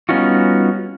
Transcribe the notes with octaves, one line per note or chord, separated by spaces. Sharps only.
G3 B3 C#4 D#4 F4 F#4